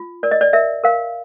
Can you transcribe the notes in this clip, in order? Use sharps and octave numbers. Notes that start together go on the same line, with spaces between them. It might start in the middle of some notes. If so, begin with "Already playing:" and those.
Already playing: F4
A#4 D5
D#5
D5
A#4 E5
A#4 F5